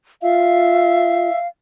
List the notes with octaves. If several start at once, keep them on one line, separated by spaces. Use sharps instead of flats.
F4 E5 F5